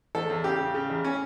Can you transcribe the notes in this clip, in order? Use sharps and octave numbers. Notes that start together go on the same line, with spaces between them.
E2 A4
E2
C#3 G4
C#3
C#3
E2
C#4